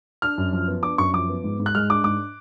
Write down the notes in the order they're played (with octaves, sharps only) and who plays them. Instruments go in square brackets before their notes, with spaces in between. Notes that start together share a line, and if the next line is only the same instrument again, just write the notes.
[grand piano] D4 [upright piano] F6
[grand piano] F#2
F3
B3
[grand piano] D4 [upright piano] D6
[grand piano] F#2 [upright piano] C#6
[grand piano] F3 [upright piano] D6
[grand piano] B3
G#2
G#2
[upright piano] F#6
[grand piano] G#3 [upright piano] F6
[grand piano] D4 [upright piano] D6
[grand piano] G#2 [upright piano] D6